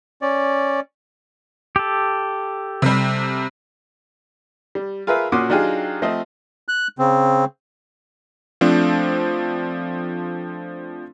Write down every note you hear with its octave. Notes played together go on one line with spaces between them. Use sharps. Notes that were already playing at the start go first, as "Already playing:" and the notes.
C#4 D5
G4 A4
C3 G3
G3
F4 G#4 A#4 B4 E5
A#2 C#4 F#4 C6 D6 D#6
F#3 D4 D#4 F4 G4 G#4
F3 A3 C4 D#5
F#6
C#3 C4
F3 A3 C4 D4